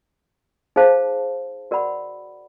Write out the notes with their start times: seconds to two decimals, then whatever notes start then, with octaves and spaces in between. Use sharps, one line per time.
0.76 D#4 G#4 C5 F5 A5
1.71 F#4 A#4 D5 F#5 B5